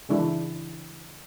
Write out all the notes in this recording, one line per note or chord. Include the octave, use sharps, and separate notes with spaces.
C#3 E3 G#3 D4 E4